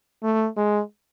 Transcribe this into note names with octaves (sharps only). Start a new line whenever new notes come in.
A3
G#3